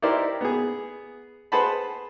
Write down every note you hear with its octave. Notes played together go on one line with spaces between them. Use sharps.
D#4 E4 G4 A#4 C5 D5
B3 G#4
G#4 B4 C5 F#5 A5 B5